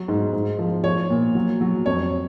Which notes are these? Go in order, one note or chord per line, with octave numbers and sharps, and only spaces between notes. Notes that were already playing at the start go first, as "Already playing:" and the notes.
Already playing: F#3
G#2
G#2
F3
F3 C#5
A#2
F#3
F#3
F2 C#5